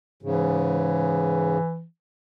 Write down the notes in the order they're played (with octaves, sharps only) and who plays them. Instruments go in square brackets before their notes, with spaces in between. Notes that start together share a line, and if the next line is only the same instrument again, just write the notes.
[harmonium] G#2 C#3 [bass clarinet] E3